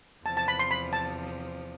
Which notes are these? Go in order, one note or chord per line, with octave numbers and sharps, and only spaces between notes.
E2 C3 F3 A5
A5
B5
C6
B5
A5